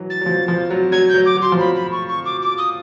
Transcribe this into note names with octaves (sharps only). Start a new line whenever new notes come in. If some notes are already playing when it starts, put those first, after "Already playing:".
Already playing: E3 F#3
A6
F#3
F3
F3
F#3
F#3 G#6
G6
F#3
D6
F#3
C6
F3
F#3 B5
B5
C#6
C#6
D6
D6
D#6